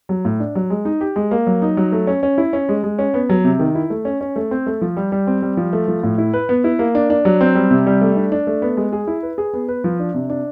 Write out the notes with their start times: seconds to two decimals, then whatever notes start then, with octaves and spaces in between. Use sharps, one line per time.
0.09 F#3
0.25 A2
0.40 D4
0.55 F#3
0.70 G#3
0.85 D#4
1.01 G4
1.16 G#3
1.31 A#3
1.47 F#3
1.62 D#4
1.77 F#3
1.92 A3
2.07 C#4
2.23 C#4
2.38 E4
2.53 C#4
2.69 G#3
2.83 G#3
2.99 C#4
3.14 B3
3.29 F#3
3.44 C3
3.60 D#3
3.75 E4
3.90 A3
4.05 C#4
4.21 C#4
4.36 A3
4.51 C4
4.66 A3
4.81 F3
4.97 G3
5.12 G3
5.27 C4
5.42 G3
5.57 F3
5.73 A3
5.88 F3
6.03 A2
6.18 E4
6.34 B4
6.49 B3
6.64 E4
6.79 A#3
6.95 D4
7.10 D4
7.25 F#3
7.41 C4
7.55 G3
7.71 C3
7.86 G3
8.01 A3
8.16 D4
8.32 D4
8.47 A3
8.62 B3
8.77 G#3
8.93 G#4
9.07 E4
9.23 B4
9.38 G#4
9.54 B3
9.68 B4
9.84 F3
10.00 D4
10.14 C3
10.29 D4